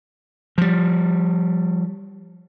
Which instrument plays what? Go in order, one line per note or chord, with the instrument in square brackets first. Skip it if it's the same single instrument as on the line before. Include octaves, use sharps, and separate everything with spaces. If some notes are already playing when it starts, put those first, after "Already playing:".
[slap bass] F3 G3